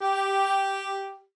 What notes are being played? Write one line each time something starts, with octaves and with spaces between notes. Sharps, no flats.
G4